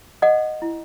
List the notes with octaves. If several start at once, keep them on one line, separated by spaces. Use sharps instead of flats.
A4 D#5 F#5
E4